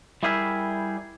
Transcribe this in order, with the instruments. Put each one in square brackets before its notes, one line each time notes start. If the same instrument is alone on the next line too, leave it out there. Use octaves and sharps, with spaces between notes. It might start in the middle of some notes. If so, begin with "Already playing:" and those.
[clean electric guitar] G3 E4 G4 G#4 A#4 E5